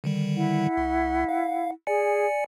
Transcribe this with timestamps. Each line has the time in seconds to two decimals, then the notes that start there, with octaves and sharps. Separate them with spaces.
0.04 D3 D#3 G3
0.36 E4 F#5
0.77 C2
1.29 F5
1.87 G#4 D5 G#5 C#7